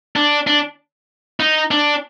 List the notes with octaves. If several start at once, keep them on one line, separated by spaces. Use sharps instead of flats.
D4
D4
D#4
D4